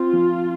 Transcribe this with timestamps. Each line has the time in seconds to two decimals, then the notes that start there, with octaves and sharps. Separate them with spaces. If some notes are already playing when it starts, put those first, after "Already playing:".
Already playing: C4 F4
0.13 F3